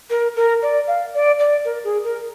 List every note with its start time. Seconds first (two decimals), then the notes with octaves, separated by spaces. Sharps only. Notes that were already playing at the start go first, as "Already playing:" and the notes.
0.10 A#4
0.36 A#4
0.63 D5
0.87 F5
1.14 D5
1.39 D5
1.65 A#4
1.84 G#4
2.04 A#4